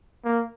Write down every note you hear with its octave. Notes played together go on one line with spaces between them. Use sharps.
A#3